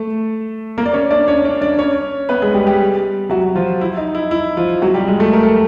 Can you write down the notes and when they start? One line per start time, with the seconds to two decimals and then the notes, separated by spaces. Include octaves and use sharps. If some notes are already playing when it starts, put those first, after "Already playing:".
Already playing: A3 A4
0.78 A#3 A#4
0.86 D5
0.93 C#4 C#5
1.11 D4 D5
1.28 C#4 C#5
1.44 D4 D5
1.61 D4 D5
1.78 C#4 C#5
2.29 B3 B4
2.42 G#3 G#4
2.54 G3 G4
2.67 G3 G4
3.30 F#3 F#4
3.55 F3 F4
3.81 E4
3.97 D#4
4.15 E4
4.31 E4
4.57 F3 F4
4.82 F#3 F#4
4.94 G3 G4
5.08 G#3 G#4
5.20 A3 A4
5.33 A#4
5.43 A4